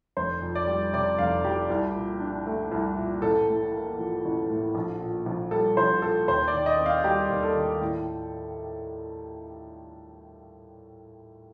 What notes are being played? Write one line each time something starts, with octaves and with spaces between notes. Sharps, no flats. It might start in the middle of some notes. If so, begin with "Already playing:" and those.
F1 C5
F2
D5
G3
C3 D5
F1 F5
F2 G4
C2
A#2
D4
A3
C2
A#2
A1 A4
A2
A#3
F3
A1
A2
A#1
A#2
A#1
G3 A4
A#1 C5
A#2 A4
D#2 C5
D5
D#3
D#5
C4
F5
G3 G4
D#2
A4
D#3
A2